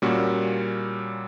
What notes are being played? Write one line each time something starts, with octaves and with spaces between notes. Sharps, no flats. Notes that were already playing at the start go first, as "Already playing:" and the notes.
A#2 G3 A#3 C#4 F#4